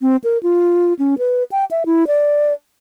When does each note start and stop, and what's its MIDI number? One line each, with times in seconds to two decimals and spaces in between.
0.02 0.16 60
0.24 0.38 70
0.43 0.93 65
0.99 1.15 61
1.19 1.43 71
1.52 1.65 79
1.71 1.83 76
1.86 2.07 64
2.07 2.53 74